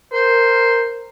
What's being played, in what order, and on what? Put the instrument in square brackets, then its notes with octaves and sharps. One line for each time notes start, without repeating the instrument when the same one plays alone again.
[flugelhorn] A#4 [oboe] C5